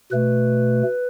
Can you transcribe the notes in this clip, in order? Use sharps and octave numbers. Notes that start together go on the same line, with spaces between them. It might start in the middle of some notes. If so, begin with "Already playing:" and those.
B2 A3 B4